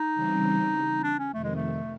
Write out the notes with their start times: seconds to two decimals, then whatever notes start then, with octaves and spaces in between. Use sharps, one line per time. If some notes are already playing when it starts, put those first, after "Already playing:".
Already playing: D#4
0.15 C#3 E3 G3 C4
1.03 D4
1.19 C#4
1.33 F2 C3 D#3 A3
1.44 G#3
1.55 A3